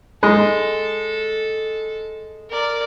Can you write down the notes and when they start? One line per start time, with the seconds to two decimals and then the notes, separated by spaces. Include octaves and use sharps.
0.23 G#3 A4
2.50 A#4 D5